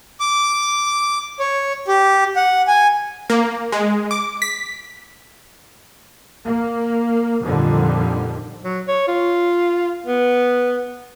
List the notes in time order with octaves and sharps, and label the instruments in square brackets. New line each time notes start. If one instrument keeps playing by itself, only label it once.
[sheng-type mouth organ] D6
C#5
G4
F#5
G#5
[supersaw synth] A#3
G#3
D6
B6
[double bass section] A#3
F2 A#2 D3 D#3 F3 G3
[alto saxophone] F#3
C#5
F4
B3